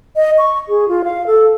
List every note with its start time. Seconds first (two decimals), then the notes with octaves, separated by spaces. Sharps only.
0.16 D#5
0.38 C#6
0.69 G#4
0.88 F4
1.04 F5
1.27 A4